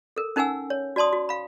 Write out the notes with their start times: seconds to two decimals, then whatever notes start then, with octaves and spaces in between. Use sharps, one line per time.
0.16 A4 A#4
0.36 C#4 D#4 A#4 F#5 G#5 E6
0.70 C#5
0.96 F#4 D5 A5 C6 D#6
1.13 F#4
1.29 F5 B5